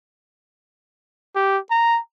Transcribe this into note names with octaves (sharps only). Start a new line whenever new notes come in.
G4
A#5